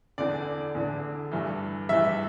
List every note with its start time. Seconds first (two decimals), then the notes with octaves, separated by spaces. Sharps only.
0.18 E2 D3 D5
0.75 E2 D3
1.31 G2 E3
1.89 G2 E3 E5